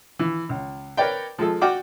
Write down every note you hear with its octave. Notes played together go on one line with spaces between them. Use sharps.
E3
C#2
A#4 B4 C#5 D5 G5
F3 G#3 A4
F#4 D5 F#5 G5 D6 F6